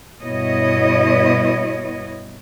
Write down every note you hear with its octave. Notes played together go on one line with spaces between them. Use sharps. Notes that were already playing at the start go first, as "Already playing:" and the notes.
G2 B2 B3 E4 C#5 D#5